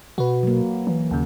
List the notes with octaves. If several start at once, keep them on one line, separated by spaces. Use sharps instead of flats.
B2 F#4 B4
F#3 A#3
E3
D#2 C#3